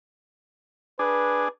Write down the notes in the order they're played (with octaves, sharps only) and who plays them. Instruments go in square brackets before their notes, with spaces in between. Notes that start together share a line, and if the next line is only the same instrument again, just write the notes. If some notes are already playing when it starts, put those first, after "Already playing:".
[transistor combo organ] D4 G#4 [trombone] B4